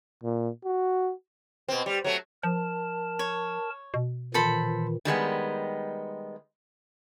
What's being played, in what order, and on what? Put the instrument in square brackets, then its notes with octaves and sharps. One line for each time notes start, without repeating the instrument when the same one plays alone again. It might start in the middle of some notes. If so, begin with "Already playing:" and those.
[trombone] A#2
F#4
[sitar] B2 C4
G3
F#3 A3
[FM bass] F3 [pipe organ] A#4 A5
[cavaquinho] C#5
[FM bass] B2
[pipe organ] A#2 D#3 E3 [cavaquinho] A4 C5 B5
[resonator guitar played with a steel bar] D#3 G3 G#3 B3